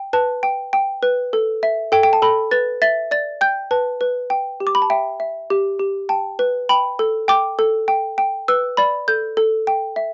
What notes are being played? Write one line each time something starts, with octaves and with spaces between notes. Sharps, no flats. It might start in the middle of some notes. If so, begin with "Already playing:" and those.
Already playing: G5
B4 A5
G5
G5
B4
A4
E5
A4 G5
G5
A5
A4 B5
B4 A6
E5 A6
D5 A6
G5 G6
B4 A5
B4
G5
G4
D6
B5
A5
E5 G5
E5
G4
G4
G5 A5
B4
G5 B5
A4
G5 D6
A4
G5
G5
B4 E6
D5 B5
A4 G6
A4
G5
E5